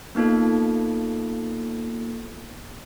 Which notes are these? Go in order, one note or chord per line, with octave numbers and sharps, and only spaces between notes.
A#3 B3 D#4 F4 A4